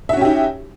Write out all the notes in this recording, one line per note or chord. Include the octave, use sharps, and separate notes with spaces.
C#4 D#4 F#4 G4 E5